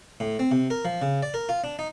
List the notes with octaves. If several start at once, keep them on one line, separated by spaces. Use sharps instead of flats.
A2
C4
C3
A#4
F3
C#3
D5
A#4
F4
D4
D#4